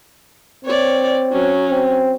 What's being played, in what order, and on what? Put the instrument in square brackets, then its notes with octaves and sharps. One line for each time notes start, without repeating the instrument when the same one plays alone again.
[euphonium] C4 [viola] C#5 D5
[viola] F#3 C#4
[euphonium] C4